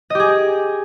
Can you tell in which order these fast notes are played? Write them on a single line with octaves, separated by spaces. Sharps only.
D#5 G4 G#4